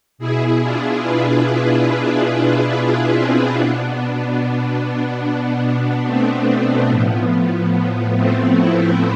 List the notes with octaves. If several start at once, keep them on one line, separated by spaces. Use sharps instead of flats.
B2 E4 G#4
D4 F4
G#4 B4
E4 G#4
D4 F4
D4 F4
C4 E4
B2 B3 D4
B3
A3 C4
B3 D4
A2 F3 B3
B3
A3 C4
C4 E4